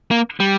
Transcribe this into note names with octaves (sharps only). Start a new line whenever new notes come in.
A#3
G3